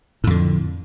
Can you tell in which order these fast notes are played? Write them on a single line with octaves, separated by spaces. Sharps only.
A2 F2 D3